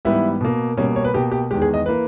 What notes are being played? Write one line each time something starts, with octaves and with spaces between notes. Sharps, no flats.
G#2 E3 G3 B3 E4
B2 A#3
B2 G3 A#3 C#4
C#5
B4
B2 A#3 G4
G4
E2 D#3 G#3 G4
G#4
D#5
E3 A#3 B4